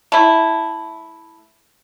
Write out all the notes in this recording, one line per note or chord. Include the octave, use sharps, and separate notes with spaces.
A3 E4